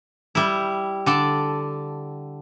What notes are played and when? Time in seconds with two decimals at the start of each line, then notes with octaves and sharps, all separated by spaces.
0.35 G3 E4
1.06 D3 D5 A5